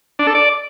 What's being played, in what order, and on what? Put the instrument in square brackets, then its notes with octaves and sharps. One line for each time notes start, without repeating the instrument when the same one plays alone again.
[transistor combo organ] D4
A4
D5